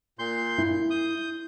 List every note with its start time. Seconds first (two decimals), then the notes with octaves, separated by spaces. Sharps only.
0.19 A#2 C6 G6
0.58 E4
0.90 D#6 G6